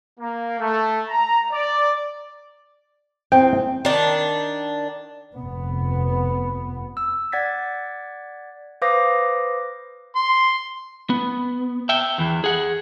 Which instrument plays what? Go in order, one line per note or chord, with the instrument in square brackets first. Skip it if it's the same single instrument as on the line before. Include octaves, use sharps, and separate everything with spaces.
[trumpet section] A#3
A3
A#5
D5
[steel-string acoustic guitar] E2 C4 [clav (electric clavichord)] G5
[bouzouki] D#3 D4 A5
[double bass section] F1 B3
[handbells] E6
D5 F#5 G#6 A6 B6
B4 C5 F5 D6 D#6 A#6
[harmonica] C6
[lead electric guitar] B3
E5 G5
E2 E3
G#4 F#5